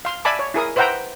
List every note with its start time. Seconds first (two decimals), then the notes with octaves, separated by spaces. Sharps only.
0.05 F5 C6
0.25 D5 E5 G#5 A5 B5 D6
0.39 C#5
0.54 E4 G#4 A#4 D#6
0.76 B4 C5 E5 F#5 G5 A#5